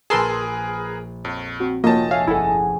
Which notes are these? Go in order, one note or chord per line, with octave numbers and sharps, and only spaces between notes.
A#1 G#4 A#4 B4 A5 C6 E6 E7
F2 C#5
C4 F#4
F1 A#3 F4 F#4 C#5 D#5 G5 A5
C#5 E5 F5 G#5
G1 C#4 E4 G#4 A4 F#5